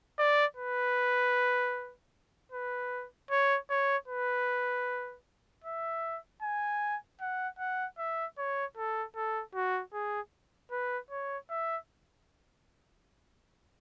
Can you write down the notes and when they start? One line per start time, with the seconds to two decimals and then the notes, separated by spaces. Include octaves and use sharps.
0.19 D5
0.57 B4
2.52 B4
3.31 C#5
3.70 C#5
4.08 B4
5.64 E5
6.42 G#5
7.21 F#5
7.59 F#5
7.98 E5
8.38 C#5
8.77 A4
9.16 A4
9.54 F#4
9.93 G#4
10.71 B4
11.10 C#5
11.50 E5